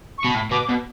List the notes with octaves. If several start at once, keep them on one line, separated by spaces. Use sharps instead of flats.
C#6
B2
A2
B2 D6
B2